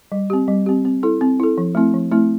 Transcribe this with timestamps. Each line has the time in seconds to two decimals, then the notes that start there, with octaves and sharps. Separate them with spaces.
0.12 G3
0.30 C4 G4
0.48 G3
0.66 C4 G4
0.85 C4
1.03 E4 A4
1.21 C4
1.40 E4 A4
1.58 F3
1.75 A3 C4 E4
1.94 F3
2.11 A3 C4 E4